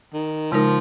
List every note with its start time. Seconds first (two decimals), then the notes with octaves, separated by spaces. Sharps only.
0.14 D#3
0.52 C#3 F3 G#3 D#4 A#4